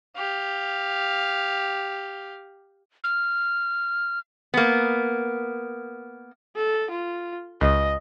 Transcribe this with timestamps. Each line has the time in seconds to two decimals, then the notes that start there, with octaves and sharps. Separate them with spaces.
0.16 G4 F5
3.04 F6
4.54 A#3 B3
6.56 A4
6.90 F4
7.61 C#2 D#5